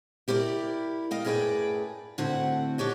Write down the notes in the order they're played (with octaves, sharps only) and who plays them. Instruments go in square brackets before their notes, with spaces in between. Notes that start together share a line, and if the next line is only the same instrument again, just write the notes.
[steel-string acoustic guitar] E4 G4 A#4 C#5 D5
D#5 F5 G5
F#2 A2 G#4 B4 D5 G5
A2 D3 C4 F#4 F#5
D4 G4 C#5 D#5